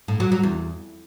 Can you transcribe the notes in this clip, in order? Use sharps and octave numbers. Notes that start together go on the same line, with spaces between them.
A2
F#3
F#3
E2